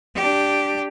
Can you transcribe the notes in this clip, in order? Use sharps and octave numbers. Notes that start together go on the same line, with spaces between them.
D4 G4